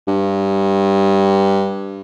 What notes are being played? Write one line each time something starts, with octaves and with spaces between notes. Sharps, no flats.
G2